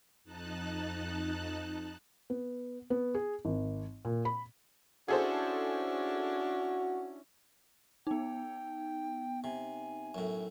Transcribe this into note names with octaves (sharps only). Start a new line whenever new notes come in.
F2 D#4 A5 F#6
B3
B3
G#4
G#1
A#2
B5
C#4 D4 E4 F#4 G#4 A4 C5
B3 D#4 G5
C3 G#5
F#2 A2